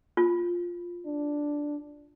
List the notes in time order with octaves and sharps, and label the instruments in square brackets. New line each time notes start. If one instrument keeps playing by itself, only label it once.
[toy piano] F4
[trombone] D4